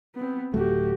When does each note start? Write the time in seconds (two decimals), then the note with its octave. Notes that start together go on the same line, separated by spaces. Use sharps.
0.15 B3 C4
0.54 D1 A3 F#4 G4